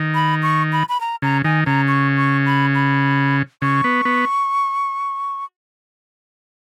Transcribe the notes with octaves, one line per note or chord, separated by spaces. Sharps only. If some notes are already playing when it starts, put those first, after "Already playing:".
Already playing: D#3
B5
C#6
B5
B5
A#5
C#3 A#5
D#3 G#5
C#3 A#5
C#6
C#6
B5
B5
C#3 C#6
B3
B3